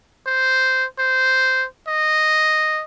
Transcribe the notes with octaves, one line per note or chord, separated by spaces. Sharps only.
C5
C5
D#5